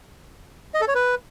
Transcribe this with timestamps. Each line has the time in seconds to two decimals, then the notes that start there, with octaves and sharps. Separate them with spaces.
0.74 D#5
0.81 A4
0.88 C#5
0.95 B4